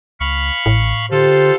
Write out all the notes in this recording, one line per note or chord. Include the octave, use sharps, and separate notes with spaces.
C#2 F5 B5 C#6
A1 A2
D3 F4 G4 A4 C5